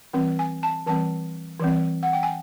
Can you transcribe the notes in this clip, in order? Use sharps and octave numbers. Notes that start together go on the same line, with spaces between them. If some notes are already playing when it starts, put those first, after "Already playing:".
E3 G3 C4
G#5
A5
E3 G3 C4 A5
E3 G3 C4
F#5
G5
G#5